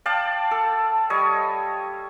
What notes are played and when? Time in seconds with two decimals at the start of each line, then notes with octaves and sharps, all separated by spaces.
0.06 D5 F5 G5 A5
0.51 A4
1.10 G3 C#5 D#5